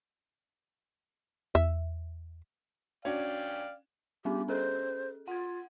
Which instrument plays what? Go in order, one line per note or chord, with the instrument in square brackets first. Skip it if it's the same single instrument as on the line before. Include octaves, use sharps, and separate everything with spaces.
[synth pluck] E2 [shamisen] E5
[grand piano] C#4 D4 F#4 [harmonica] D5 F5 G5
[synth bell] G3 B3 D4 [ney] G4
[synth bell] C#4 G#4 A4 [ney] C5
[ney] F4 [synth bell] F#5 G#6